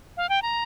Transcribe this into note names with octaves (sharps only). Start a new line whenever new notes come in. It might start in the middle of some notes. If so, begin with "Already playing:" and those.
F5
G5
A#5